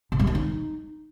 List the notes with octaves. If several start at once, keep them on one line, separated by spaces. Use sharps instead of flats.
C#3
G3
D#3
D#4